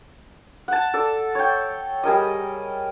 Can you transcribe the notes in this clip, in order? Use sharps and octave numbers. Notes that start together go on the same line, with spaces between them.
F#5 A5
A4 D5
C#5 G5
G3 G#4 A#4 D#5